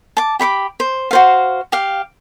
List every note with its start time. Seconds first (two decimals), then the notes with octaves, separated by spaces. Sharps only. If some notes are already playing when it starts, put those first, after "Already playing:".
0.17 A5 D6
0.39 G4 B5 C#6 D6
0.80 C5
1.11 F#4 C5 F5
1.72 G4 F5